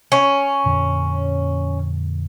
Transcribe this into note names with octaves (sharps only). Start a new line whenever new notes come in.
C#4
F2 A#2 D3